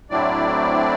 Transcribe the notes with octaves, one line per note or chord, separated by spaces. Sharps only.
A2 F#3 A3 C4 D4 E4 D5